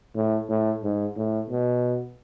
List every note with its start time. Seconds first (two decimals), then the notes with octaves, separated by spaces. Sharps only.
0.15 A2
0.49 A2
0.83 G#2
1.17 A2
1.50 B2